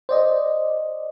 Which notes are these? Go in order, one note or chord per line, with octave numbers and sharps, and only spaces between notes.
C5 D5 D#5